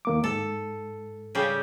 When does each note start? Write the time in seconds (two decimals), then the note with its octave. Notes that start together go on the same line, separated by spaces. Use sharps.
0.05 D#2 A#3 D6
0.24 G#2 A4
1.35 C#3 G3